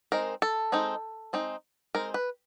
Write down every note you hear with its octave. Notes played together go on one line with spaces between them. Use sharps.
G#3 C4 D#4 A#4
A4
G#3 C4 D#4
G#3 C4 D#4
G#3 C4 D#4 A#4
B4